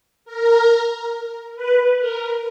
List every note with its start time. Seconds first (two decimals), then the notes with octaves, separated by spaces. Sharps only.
0.25 A#4
1.56 B4
1.99 A#4